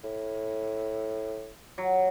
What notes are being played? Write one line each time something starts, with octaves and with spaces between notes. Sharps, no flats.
A2
F#3